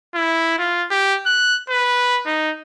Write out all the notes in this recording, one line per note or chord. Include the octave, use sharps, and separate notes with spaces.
E4
F4
G4
F#6
B4
D#4